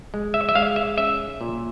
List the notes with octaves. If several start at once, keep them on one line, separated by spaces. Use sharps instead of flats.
G#3
E5
E5
G#3 F5
E5
C#4 E5
A#2